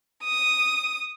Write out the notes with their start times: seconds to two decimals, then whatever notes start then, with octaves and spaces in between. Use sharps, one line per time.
0.23 D#6